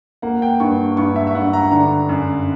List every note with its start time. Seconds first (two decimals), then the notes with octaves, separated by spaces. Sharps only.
0.22 A#3 F#5
0.42 G5
0.60 G2 C#6
0.97 G2 C#6
1.16 E5
1.27 E5
1.35 G2 F#5
1.53 A#5
1.71 D3 A#5
2.09 F#2